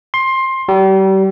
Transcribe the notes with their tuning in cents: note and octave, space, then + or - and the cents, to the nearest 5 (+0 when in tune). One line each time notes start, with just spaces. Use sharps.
C6 +20
G3 -35